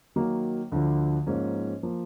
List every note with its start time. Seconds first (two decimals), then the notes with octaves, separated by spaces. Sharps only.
0.16 D#3 F#3 A#3
0.72 D2 D3 F3
1.26 G#2 F3 A#3 C#4
1.83 F3 A#3